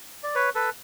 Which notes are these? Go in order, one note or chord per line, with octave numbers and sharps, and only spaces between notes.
D5
B4 C#5
A4 B4